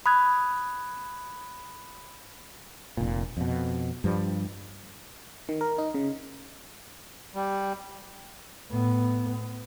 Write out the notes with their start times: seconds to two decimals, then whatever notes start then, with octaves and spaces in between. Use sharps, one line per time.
0.06 B5 D#6 F#6 G#6
2.97 F1 A#2
3.37 F2 B2
4.04 G2 F3 G3
5.49 D#3
5.61 A#4
5.78 D#4
5.94 C#3
7.35 G3
8.71 A2 B3